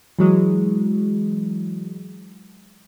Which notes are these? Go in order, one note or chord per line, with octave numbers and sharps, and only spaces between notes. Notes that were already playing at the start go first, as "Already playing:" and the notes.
E3 F#3 G#3